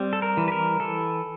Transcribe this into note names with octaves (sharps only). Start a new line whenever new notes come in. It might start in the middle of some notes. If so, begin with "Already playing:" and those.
Already playing: G3 C4
A4
A#4
E3
B4
A#4
E3 A4